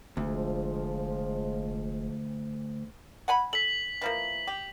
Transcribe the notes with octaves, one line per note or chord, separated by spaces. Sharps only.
F1 D2 F3 G#3
F#5 G#5 B5
A4 B6 F#7
E3 F3 A#3
G4